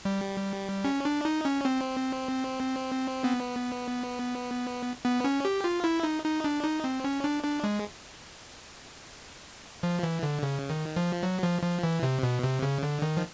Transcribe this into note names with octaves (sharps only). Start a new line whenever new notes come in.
G3
C#4
D4
D#4
C#4
C4
B3
B3
C#4
G4
F4
E4
D#4
D#4
D4
D#4
C4
C#4
D4
D4
G#3
F3
E3
D3
C#3
D#3
F3
F#3
F3
F3
E3
C3
B2
C3
C#3
D3
D#3
F3